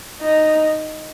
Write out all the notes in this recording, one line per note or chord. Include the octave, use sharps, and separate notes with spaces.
D#4